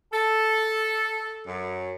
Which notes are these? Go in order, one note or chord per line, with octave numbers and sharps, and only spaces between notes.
A4
F#2